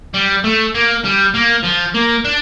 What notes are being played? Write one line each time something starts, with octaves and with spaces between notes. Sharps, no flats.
G3
A3
A#3
G3
A#3
F3
A#3
D4